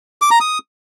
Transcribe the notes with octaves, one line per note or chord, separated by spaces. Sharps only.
D6
A#5
D#6